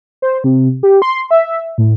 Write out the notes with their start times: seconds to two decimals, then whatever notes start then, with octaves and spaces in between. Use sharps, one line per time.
0.22 C5
0.44 C3
0.83 G4
1.02 C6
1.31 E5
1.78 A2